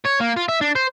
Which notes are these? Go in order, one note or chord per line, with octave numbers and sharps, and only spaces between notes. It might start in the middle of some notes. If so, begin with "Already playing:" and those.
C#5
A#3
F4
E5
D4
C5